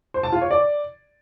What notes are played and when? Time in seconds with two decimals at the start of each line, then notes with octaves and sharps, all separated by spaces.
0.14 C5
0.23 A5
0.32 F4
0.42 C#5
0.51 D5